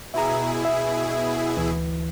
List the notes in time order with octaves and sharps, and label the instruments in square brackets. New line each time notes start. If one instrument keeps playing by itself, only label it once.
[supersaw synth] B2 E4 G#4 [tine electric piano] E5 A#5
[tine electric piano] E5
D2 E3